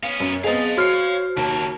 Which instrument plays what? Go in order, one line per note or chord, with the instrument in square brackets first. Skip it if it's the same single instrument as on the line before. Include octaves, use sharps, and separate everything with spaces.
[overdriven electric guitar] B3 C#4 [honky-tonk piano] F5
[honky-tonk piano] F#2
[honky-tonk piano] B3 C4 G#4 [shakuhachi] D#5 [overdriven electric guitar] F5 A5
[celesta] F#4 F6 [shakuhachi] C5 [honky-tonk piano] C#5 C7
[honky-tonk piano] D#2 [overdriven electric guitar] C#3 A#3 [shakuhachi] A5